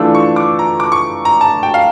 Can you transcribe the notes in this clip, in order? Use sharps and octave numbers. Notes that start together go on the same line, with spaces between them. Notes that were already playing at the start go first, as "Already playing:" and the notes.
Already playing: E3 A3 D4 F4 E6
C#6
D6
A#5
D6
C#6
A#5
A5
G5
F5